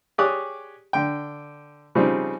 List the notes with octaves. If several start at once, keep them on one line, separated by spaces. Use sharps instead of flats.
G4 G#4 C#5 D5 D#6 F#6
D3 G5
C#3 F3 G3 C4 D#4